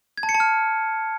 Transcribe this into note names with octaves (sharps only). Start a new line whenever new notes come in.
G#6
A5
C#7
A5
F6